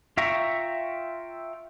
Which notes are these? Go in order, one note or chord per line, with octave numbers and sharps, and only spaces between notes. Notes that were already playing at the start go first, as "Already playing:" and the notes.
F4 E5 G5 A#5 C#6